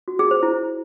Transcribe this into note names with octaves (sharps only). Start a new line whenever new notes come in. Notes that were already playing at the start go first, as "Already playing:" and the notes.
F#4
G#4
C5
E4